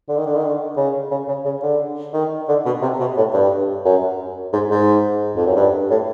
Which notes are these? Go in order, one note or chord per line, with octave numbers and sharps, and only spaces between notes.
D3
D#3
D3
D#3
D3
C#3
C#3
C#3
C#3
D3
D#3
D3
B2
C3
B2
A2
G2
F#2
G#2
G#2
F2
F#2
G2
A2